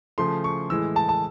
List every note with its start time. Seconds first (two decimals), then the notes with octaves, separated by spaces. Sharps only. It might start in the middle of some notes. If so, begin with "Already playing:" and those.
0.18 C#3 F3 A3 C6
0.44 C#6
0.70 A2 E3 G#3 E6
0.96 A5
1.09 A5